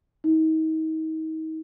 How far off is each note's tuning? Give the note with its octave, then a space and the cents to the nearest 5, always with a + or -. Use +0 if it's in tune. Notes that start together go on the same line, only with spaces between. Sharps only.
D#4 +35